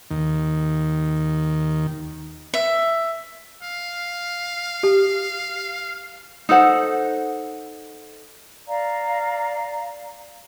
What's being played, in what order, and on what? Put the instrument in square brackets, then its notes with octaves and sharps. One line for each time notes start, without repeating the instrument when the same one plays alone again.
[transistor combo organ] D#2 D#3
[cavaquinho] E5
[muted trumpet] F5
[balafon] G4
[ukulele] D#4 A4 C5 F#5
[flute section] D5 F5 A#5